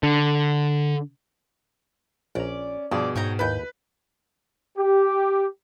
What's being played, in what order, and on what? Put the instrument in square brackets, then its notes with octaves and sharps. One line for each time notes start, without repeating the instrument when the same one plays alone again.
[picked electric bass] D3
[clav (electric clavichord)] A#1 A#5 [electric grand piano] C#4 [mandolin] D5
[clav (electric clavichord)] G2 F3 [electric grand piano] B2 G#4 [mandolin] D5
[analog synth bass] G#2 [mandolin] C#5 G5 A#5
[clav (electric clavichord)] D#2 E4 A5 [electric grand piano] B4 [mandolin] B5 G6
[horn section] G4